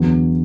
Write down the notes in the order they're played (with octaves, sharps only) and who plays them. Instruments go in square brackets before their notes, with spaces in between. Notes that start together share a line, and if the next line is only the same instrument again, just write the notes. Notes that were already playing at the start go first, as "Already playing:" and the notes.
Already playing: [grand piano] E2 D3 F#3 B3